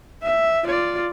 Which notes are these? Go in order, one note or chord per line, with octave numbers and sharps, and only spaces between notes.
E5
F4 D5